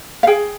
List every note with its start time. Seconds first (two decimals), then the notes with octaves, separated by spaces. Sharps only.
0.23 F5
0.27 G#4 G5